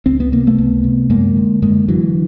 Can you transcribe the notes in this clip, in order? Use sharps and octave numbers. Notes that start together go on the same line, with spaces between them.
C#2 C4
B3
C3 A#3
A3 B3
C#2
C3
F#2 G#3 A#3
D3
F#2 G#3 A#3
D3 E3 F#3